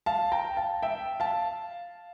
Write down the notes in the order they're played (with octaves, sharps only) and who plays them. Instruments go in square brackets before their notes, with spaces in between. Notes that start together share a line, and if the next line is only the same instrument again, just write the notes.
[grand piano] F5 A5
G5 A#5
F5 A5
E5 G5
F5 A5